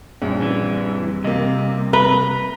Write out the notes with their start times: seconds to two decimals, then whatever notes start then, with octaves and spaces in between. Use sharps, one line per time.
0.22 A#1 F#2 G3 C4
0.42 E3
1.24 C3 A#3 D#5
1.93 B4 A#5 G7